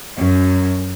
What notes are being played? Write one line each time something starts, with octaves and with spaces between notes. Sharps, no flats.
F#2